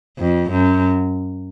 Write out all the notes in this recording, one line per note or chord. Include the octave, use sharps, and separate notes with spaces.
F2
F#2